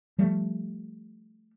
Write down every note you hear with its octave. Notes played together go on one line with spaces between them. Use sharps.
F3 G3 A3